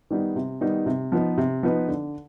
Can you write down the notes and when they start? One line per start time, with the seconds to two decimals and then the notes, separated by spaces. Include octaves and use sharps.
0.10 D#3 G3 B3 D#4
0.36 C3
0.61 D#3 G3 B3 D#4
0.86 C3
1.12 F3 B3 D#4 B4
1.38 C3
1.63 F3 B3 D#4 B4
1.88 D3